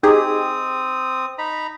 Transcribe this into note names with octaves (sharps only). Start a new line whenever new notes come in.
C4 D#4 G4 G#4 D#6
D#4 A#5 B5